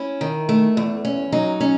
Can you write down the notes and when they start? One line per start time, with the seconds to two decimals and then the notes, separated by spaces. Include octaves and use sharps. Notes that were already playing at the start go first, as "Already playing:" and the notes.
Already playing: C#4 E4
0.21 D#3
0.49 A3
0.77 E2
1.05 C#4
1.32 F#3 D#4
1.61 C#4